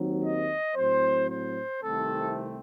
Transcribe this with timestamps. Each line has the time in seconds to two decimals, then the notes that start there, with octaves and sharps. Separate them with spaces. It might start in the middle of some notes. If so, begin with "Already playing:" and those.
Already playing: D#2 D#3 F#3 C4
0.23 D#5
0.75 A2 F#3 C4 C5
1.28 C5
1.81 C2 C3 D#3 A3 C4 A4